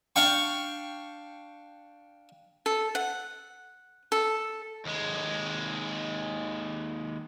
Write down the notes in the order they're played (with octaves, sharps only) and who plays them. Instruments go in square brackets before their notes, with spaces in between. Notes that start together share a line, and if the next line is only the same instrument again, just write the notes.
[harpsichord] D4 F5 G5 C#6
[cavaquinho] A4
F#5
A4
[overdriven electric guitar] D#2 G#3